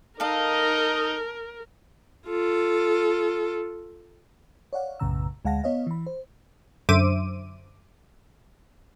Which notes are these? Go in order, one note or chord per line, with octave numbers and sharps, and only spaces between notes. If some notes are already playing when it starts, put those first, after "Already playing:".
D#4 A4 A#4 D#5 F5
F4 A4
C#5 D5 F5 F#5
B1 F#2 A2 C#3 A#5 E6
D2 G#3 F5 F#5 A5 A#6
B3 C#5 D#5 F5
E3 B5
C5
F#2 D3 C5 E5 D6 D#7